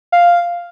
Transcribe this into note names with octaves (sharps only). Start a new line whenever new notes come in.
F5